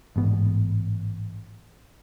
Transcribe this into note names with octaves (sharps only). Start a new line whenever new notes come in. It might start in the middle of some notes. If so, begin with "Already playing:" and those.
A1 G#2 B3